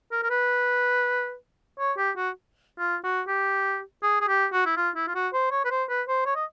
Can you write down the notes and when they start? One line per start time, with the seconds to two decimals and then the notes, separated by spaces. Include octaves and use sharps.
0.12 A#4
0.23 A#4
0.30 B4
1.79 C#5
1.98 G4
2.17 F#4
2.79 F4
3.04 F#4
3.28 G4
4.03 G#4
4.21 G#4
4.28 G4
4.53 F#4
4.66 E4
4.77 F4
4.96 E4
5.07 F4
5.15 F#4
5.34 C5
5.52 C#5
5.65 B4
5.71 C5
5.89 B4
6.08 C5
6.26 C#5
6.36 D#5